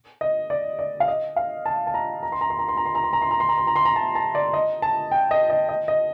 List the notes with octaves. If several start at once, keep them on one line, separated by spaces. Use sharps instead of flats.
D#5
D5
D5
F5
D#5
F5
A5
A5
A#5
A#5
C6
A#5
C6
A#5
C6
A#5
C6
A#5
C6
A#5
C6
A#5
C6
A#5
C6
A#5
C6
A#5
A5
A5
D5
D#5
A5
G5
D#5
D#5
D#5
D#5